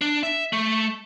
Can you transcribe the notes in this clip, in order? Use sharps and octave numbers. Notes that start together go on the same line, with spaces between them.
D4
E5
A3